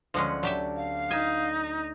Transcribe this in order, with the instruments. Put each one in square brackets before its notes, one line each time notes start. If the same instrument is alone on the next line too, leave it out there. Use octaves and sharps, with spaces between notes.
[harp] D2 F#5 [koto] F3 G#3 C#4
[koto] F#3 G4 E5 [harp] D4
[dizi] F5
[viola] D#4 [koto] E5 G#5